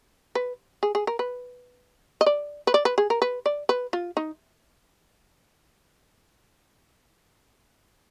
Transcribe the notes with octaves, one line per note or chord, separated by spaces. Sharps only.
B4
G#4
G#4
A#4
B4
D#5
D5
B4
D5
B4
G#4
A#4
B4
D5
B4
F4
D#4